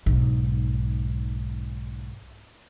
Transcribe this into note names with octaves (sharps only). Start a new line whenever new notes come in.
B1 G#2